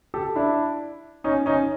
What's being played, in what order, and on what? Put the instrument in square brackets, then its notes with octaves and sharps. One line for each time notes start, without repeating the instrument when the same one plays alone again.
[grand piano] G4 A4
D4 E4
C#4 D#4
C#4 D#4